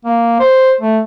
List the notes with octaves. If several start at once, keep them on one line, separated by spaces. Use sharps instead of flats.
A#3
C5
A3